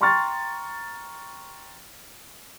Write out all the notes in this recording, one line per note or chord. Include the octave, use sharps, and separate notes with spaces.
G5 A#5 C6 C#6 F6 A6